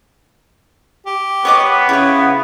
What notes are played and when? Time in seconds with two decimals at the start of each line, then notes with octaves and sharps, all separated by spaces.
1.06 G4
1.45 B3 C#5 D#5 D6
1.89 C#3 E4 C#5